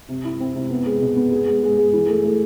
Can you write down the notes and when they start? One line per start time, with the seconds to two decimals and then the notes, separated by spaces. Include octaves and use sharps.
0.08 C3
0.25 E4
0.40 C4
0.55 C3
0.71 B3
0.86 G#3
1.02 B2
1.17 B3
1.32 G#4
1.48 G#3
1.63 G#3
1.78 G#3
1.93 E3
2.08 A3
2.24 A3